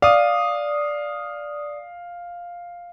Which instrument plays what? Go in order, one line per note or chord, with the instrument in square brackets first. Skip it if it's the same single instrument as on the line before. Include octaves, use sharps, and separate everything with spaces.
[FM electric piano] D5 D#6 [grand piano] F5